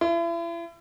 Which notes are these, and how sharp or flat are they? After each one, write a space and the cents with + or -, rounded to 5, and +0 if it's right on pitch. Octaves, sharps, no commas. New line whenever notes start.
E4 +40